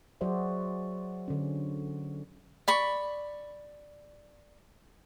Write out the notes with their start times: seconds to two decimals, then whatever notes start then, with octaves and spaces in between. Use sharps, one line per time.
0.21 F#3 F#4 G#4 C5 D5 E5
1.28 D3 C#4
2.68 D5 B5 C#6